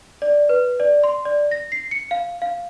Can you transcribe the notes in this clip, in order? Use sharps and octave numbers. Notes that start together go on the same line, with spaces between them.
D5
B4
D5
C6
D5
A#6
C7
C#7
F5
F5